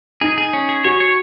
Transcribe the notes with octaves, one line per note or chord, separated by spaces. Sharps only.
D#4 G#4
G#4
C#4
G#4
F#4 C#5
C#5